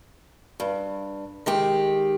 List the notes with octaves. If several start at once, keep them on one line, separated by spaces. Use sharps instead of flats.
G2
D#3 G#3 G4